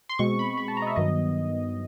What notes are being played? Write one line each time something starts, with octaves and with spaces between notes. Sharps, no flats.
C6
B2 G#3 C4 C#6
B5
B5
A5
A#5
D#5
E5
G2 D#3 F#3 B3 D#5